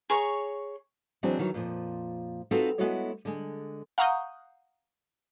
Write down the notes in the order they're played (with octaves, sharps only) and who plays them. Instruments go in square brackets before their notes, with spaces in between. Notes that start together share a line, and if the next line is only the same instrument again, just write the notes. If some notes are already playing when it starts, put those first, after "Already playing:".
[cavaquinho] G#4 C#5 A#5 C#6
[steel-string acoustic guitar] E3 F#3 G#3 C4 D4
D#3 E3 F#3
F2 A#2 F3
C4 D#4 F4 F#4 A4 B4
G#3 B3 E4 F#4 A4 C#5
D3 G#3
[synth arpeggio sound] F5 F#5 A#5 C#6 D#6 G6